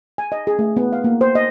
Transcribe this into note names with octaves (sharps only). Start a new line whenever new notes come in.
G#5
D#5
G#4
A3
B3
F5
A#3
C5
D#5